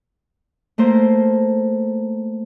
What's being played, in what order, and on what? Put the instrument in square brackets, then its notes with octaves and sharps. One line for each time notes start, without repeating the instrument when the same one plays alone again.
[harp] A3 A#3 A#4 C5